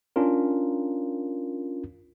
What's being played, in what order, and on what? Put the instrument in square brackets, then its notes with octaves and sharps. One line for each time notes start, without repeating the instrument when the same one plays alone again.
[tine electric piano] C#4 D4 F4 A#4